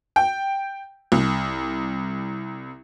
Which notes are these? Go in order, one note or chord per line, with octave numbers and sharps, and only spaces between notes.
G5
C2